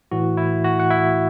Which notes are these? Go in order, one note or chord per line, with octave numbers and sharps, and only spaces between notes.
A2 E3 A3 E4 F#4
E4
F#4
F#5
E4 E5